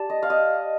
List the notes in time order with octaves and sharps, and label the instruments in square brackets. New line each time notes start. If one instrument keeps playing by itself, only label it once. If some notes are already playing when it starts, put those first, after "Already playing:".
Already playing: [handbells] G4 D5 A5
[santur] D#5
F5
D#5